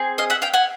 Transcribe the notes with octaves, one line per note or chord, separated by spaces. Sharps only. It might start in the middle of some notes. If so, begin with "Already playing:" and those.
Already playing: C4 G#4
D#5 F5
E5 F#5
F5 G5
F#5 G#5